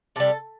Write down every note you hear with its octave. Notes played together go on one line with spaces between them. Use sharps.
C3 G3 A4